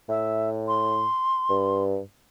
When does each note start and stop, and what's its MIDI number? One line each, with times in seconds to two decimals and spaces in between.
0.09 1.07 45
0.09 0.50 76
0.68 1.83 84
1.50 2.00 43